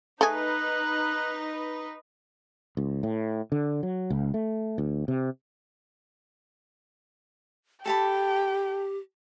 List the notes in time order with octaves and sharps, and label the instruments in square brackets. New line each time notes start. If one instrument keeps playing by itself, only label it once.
[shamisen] A3 G#4 [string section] D#4 B4 [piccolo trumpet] F#6
[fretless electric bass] C#2
A2
D3
F#3
C#2
A3
D2
C3
[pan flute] G4 [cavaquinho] A4 A5 B5 [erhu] G5